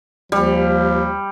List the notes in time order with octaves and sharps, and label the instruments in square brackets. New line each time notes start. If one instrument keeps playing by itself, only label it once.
[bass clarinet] D#2 [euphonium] F3 [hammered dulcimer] G3